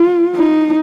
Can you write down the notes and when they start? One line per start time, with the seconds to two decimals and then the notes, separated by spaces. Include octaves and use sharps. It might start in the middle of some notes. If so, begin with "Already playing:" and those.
Already playing: F4
0.36 D#4